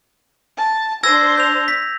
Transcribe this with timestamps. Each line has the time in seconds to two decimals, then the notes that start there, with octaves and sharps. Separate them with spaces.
0.58 A5
1.03 D4 C5 E6 G#6 A#6
1.37 G6 F7
1.68 B6